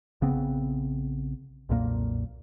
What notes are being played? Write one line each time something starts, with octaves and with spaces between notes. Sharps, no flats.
A#1 C#3 B3 C4
B1 F2 A#2 A#3